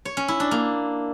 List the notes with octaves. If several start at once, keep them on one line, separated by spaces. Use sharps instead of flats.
C#5
C#4
E4
D4
A#3